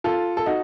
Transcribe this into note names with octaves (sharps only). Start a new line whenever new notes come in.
F4 A4
A4
D#4 F#4